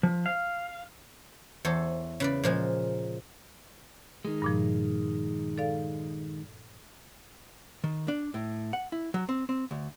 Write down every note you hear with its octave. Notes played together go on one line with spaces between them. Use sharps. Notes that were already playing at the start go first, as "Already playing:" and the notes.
F3
F5
E2 A4 C5 C#5
C#3 B4 D5
A#2 F3 G#3
D#3 G#3
G2 A#2 F3
A4 D5 F5
D#3
D4
A2
F#5
E4
F#3
C4
C4
D2